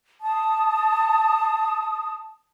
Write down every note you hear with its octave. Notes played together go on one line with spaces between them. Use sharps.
A5 D#6